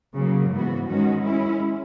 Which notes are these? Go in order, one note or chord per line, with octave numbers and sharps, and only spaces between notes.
C#3 F#3 A#3
G#2 E3 B3 F#4
D#3 G#3 C#4 F#4
G#3 C#4 E4